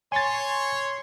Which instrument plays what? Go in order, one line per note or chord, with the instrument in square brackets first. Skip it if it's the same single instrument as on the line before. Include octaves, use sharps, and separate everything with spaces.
[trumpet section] C#5 [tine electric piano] G#5 A6 [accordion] C6